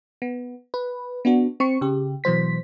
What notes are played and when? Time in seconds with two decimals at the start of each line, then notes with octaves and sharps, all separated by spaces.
0.22 B3
0.74 B4
1.25 B3 D4 F#4
1.60 C4 C#6 C#7
1.81 C#3 G4
2.24 B2 E3 F#3 C5 B6